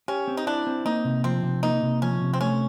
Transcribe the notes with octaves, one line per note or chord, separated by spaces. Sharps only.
C#4 G4
C4
D#4
D4 E4
C4
A#3 D#4
C3
F3 C4
C3
A#3 D#4
C3
F3 C#4
C3
C4
A3 C#4